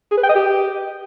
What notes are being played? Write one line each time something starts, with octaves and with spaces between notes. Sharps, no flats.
G#4
B4
G5
D#5
G4